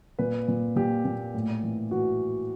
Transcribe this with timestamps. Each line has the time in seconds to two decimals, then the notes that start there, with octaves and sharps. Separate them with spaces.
0.19 A#2 B4
0.48 A#2
0.76 A#2 G4
1.05 A#2
1.34 A2
1.63 E3
1.91 E3 F#4